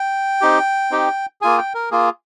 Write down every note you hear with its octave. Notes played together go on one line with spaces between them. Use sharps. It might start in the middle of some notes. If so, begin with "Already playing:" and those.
Already playing: G5
C4 D#4 G4
C4 D#4 G4
A#3 F4 G#4 G#5
G5
A#4
A#3 F4 G#4